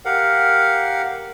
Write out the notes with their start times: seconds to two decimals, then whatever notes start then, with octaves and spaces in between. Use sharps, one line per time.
0.05 G4 A#4 F5 F#5